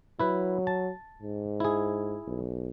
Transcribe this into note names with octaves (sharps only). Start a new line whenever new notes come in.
F#3 E4 B4
A5
G#2
E4 G#4
B1